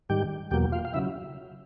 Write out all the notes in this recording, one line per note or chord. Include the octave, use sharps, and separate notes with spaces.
G#2 D#3 G3 G4 G5
E2 B2 F#3 A#3 G4 G5
F4 F5
F5
C#3 F#3 E4 E5